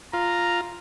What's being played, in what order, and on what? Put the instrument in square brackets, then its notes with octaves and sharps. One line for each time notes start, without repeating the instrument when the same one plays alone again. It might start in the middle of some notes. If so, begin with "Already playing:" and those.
[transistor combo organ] F4 [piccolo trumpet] A#5